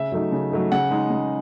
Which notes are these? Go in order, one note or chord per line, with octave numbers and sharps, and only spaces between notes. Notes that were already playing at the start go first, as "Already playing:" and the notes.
Already playing: C#3 E5
F#3 A3 D#4
C#3
F#3 A3 D#4
C#3 F#5
G#3 D#4
C#3